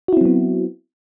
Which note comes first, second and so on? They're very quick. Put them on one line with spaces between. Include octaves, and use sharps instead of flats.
F#4 E4 C4 F#3 B3